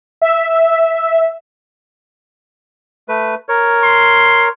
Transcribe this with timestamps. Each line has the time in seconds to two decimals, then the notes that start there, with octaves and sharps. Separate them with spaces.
0.22 E5
3.09 A3 B4
3.49 A#4 C#5
3.83 C6